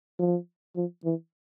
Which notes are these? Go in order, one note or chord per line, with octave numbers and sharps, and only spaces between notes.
F3
F3
E3